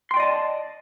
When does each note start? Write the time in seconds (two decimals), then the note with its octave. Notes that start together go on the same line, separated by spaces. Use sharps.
0.11 C6
0.14 G5
0.17 D5
0.20 D#5
0.23 A5